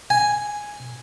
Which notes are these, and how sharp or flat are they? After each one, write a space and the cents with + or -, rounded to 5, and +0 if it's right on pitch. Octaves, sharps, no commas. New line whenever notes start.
G#5 +0